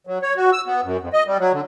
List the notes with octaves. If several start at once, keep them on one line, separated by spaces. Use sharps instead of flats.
F#3
C#5
F#4
E6
B3
F#2
F2
D#5
G3
F#3
D3